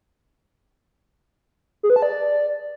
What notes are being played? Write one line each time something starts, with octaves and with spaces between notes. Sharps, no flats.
G#4
B4
A5
D5